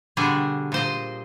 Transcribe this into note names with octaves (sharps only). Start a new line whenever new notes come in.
B2 D3 G3 G#4
A#2 C5 D#5